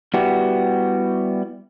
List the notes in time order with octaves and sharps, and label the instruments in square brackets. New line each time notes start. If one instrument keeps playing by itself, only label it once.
[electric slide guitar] G3 B3 E4 F#4 G4